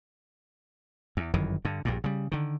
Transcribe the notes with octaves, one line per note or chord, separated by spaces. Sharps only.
E2
G1 F#2 D#3 E3
G2 D3
A#1 G2 A#2
C#3 G3
D3 D#3